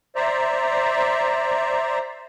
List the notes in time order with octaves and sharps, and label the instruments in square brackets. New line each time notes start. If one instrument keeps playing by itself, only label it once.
[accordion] C5 D5 E5 A#5